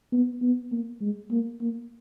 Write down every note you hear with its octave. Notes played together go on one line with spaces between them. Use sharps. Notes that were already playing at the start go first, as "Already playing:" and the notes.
B3
B3
A#3
G#3
A#3
A#3